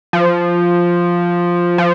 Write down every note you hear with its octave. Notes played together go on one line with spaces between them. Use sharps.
F3
F3